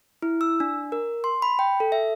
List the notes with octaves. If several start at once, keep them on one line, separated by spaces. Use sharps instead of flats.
E4
E6
D4
A#4
C6
B5
G5
A4
E5